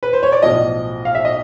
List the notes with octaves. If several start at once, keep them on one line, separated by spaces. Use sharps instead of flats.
B4
C5
C#5
D5
B1 A2 F3 D#5
F5
E5
D#5